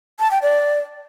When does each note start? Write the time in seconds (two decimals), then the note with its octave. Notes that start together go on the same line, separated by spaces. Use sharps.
0.20 A5
0.31 G5
0.42 D5